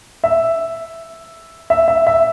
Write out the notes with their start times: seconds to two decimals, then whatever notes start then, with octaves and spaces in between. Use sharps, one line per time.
0.24 E5
1.70 E5
1.88 E5
2.07 E5